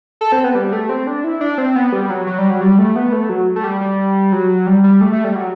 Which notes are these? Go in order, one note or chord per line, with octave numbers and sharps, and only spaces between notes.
A4
C4
B3
G3
A3
C4
D4
E4
D4
C4
B3
G3
F#3
F#3
G3
F#3
G3
A3
B3
A3
F#3
A3
G3
G3
F#3
G3
G3
A3
A3
G3
F#3